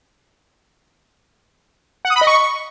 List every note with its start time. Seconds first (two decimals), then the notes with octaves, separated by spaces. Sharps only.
2.05 F#5
2.10 D#6
2.16 B5
2.21 D#5
2.27 C#6